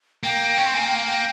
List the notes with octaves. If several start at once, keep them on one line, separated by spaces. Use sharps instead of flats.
A#3 G5
C#4
C4
A#3 G#5
G5
F5
G5